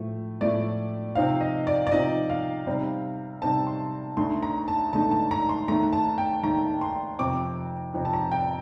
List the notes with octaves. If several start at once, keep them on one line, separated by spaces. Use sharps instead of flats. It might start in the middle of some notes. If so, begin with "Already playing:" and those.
Already playing: A2 F3 A3
A2 F3 A3 D5
C3 F3 C4 D#4 F5
D#5
D5
D5
C3 F3 C4 D#4 D#5
F5
C3 G3 C4 D#4
C3 G3 C4 D#4 A5
C6
D2 D3 A3 D#4 C6
A#5
A5
D2 D3 A3 D#4 A5
A5
A#5
C6
D#2 D#3 A3 A#5
A5
G5
D#2 D#3 A3 A#5
C6
F2 C3 F3 C4 D6
F2 C3 F3 C4
A5
A#5
G5